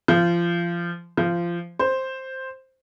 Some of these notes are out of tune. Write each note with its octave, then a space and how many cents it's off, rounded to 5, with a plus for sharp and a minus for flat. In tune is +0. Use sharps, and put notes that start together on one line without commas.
F3 -25
F3 -20
C5 +5